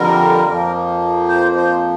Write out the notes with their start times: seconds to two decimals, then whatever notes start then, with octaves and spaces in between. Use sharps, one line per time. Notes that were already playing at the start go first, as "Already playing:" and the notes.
Already playing: F2 D3 G3 A#4
0.47 F2 F3 A#3
1.28 C5
1.56 C5